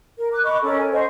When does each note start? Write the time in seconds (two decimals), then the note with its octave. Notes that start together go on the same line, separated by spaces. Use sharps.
0.18 A#4
0.32 D6 F#6
0.43 D#5 B5 C#6 D6
0.63 C#4 A4 A#4
0.78 G#5
0.92 C5 D#5 F#5 C#6